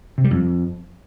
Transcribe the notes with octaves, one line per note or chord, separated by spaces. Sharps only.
C3
G3
F2